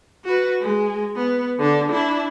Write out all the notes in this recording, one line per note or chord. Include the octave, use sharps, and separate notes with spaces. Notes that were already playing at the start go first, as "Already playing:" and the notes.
F#4 B4
G#3
B3
D3 D4
D4 E4